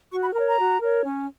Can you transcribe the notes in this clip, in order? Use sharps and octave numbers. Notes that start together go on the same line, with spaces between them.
F#4 C#6
B5
A#4 A#5
C#5
A#5
F#4
A#4 C#5
C#4